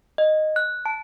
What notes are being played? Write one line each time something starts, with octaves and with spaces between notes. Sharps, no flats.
D#5
F#6
A5